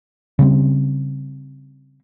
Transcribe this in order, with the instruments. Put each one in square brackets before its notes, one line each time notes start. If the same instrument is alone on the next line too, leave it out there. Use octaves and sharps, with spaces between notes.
[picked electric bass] C#3 G3 C4